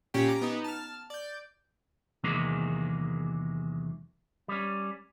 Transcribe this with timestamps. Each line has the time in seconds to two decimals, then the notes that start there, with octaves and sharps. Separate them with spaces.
0.14 A#2 C#4 G4 G5
0.28 A#5 D6 A#6
0.41 B3 D#4
0.64 A5 F6
1.10 D5 G6
2.24 E2 C3 D#3 F#3 G#3 A#3
4.48 G3 C#4